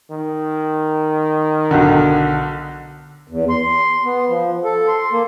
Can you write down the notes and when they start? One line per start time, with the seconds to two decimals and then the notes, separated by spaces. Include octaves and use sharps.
0.11 D#3
1.71 B1 D3
3.27 E2
3.49 C6
4.05 B3
4.29 F3
4.64 A4
4.88 C6
5.12 A#3